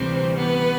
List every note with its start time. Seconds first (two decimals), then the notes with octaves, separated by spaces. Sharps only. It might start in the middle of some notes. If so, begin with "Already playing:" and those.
Already playing: D2 C3 E3 G3 C4 C5
0.36 B3 B4